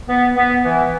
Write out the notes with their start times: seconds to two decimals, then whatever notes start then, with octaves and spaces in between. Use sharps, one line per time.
0.07 B3
0.35 B3
0.63 E3